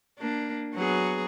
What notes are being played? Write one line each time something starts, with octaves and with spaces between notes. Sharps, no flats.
A#3 D4
F#3 B3 G#4